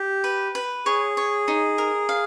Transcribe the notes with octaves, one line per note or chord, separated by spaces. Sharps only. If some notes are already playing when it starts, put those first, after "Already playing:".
Already playing: G4
B4
B4
G#4 C#5
C#5
D#4
A#4
F5